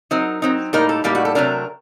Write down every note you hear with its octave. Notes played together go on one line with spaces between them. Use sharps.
F#3 C4 D#4 A#4
F#3 C4 D#4
A2 G3 A#3 D#4 A#4
A4
A2 G3 A#3 D#4 G4
F#4
A4
C3 F#3 A3 D4 A#4